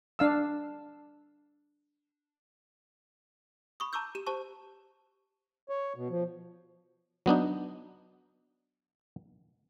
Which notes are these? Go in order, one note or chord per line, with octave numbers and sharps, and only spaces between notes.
D4 F5 E6
B5 C#6 D#6
A5 A#5 C#6 D6 E6 G6
G4 E7
G4 C5 A5 C#6
C#5
B2
F3
F#3 B3 D4 D#4